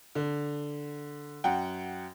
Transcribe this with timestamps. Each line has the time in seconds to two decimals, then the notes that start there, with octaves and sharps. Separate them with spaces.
0.15 D3
1.44 F#2 F#5 G5